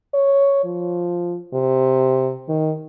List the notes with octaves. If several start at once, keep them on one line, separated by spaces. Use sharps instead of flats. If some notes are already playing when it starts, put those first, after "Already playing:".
C#5
F3
C3
D#3